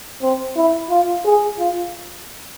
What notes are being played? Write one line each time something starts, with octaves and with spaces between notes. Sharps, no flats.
C4
E4
F4
G#4
F4